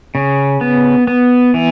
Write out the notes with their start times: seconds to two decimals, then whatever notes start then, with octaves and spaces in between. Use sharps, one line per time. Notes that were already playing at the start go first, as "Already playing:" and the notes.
0.15 C#3
0.61 B3
1.07 B3
1.54 E3